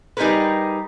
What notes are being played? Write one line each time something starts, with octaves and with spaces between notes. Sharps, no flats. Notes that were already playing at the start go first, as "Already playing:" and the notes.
G3 D#4 G4 G#4 A#4 B4